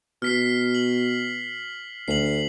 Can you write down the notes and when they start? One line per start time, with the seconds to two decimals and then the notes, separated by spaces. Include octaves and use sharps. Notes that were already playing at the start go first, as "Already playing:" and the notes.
0.22 B2 F6 B6 C7
0.75 F#7
2.08 D2 C7 F#7